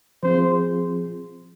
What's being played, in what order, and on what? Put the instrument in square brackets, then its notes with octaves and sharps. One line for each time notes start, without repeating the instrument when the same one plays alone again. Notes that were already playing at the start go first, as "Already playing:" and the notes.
[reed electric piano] F3 C4 F4 G#4 [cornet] C5